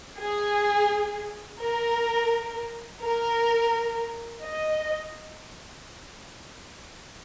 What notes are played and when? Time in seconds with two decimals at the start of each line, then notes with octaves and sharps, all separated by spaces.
0.19 G#4
1.60 A#4
3.02 A#4
4.43 D#5